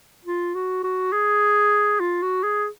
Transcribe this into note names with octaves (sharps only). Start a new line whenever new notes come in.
F4
F#4
F#4
G#4
F4
F#4
G#4